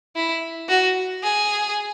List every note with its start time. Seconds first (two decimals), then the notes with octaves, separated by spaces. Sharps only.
0.16 E4
0.69 F#4
1.23 G#4